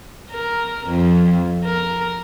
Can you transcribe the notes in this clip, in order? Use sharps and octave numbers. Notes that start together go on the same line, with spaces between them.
A#4
F2
A#4